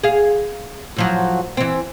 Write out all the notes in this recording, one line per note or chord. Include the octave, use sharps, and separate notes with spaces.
G#4 F5
A2 F3 F#3
E3 C4